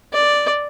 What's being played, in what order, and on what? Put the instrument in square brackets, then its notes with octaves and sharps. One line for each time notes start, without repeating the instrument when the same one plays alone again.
[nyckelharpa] D5